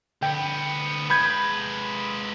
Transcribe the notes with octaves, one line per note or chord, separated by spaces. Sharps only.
D2 B3 G5
G#3 B4 B5 G6 G#6